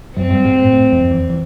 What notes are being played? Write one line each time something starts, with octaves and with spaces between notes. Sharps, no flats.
F#2 F#3 C4
G2 G3
G#2 G#3
A2 A3
A2 A3
F2 F3
E2 E3
E3